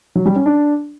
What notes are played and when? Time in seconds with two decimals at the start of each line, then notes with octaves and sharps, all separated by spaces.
0.16 F#3
0.26 G3
0.36 C#4
0.46 D4